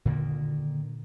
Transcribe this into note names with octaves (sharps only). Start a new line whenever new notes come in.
A#2 D3 D#3 A#3